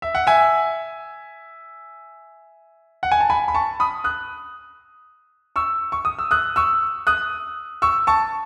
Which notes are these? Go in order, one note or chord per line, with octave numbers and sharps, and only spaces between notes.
E5
F#5
E5 G#5
F#5
G#5
A5
G#5 B5
B5
A5 C#6
B5 D#6
D#6 F#6
C#6 E6
C#6
D#6
E6
D#6 F#6
C#6 E6
D#6 F#6
C#6 E6
A5 C#6